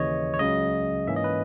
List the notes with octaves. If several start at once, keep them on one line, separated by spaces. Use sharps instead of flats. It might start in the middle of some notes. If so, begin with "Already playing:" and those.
Already playing: D#2 C#3 E3 C#5 D#5
C#5
C#2 C#3 F#3 C#4 D#5
G#2 E3 A#3 C#4 E5
D#5
B4